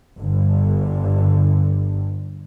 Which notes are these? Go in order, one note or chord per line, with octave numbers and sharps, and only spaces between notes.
G1 G2 D3